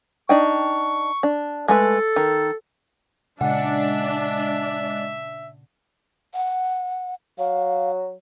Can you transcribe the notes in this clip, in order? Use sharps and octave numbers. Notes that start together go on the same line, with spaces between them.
D4 D#4 G5 C#6
D4
G#3 A3 A4 B4
D#3
A#2 C#3 G#3 D4 D#5 E5 F#5
F#5
F#3 F5